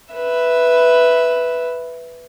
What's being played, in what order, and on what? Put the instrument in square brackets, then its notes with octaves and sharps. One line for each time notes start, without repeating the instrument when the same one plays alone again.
[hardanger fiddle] B4 E5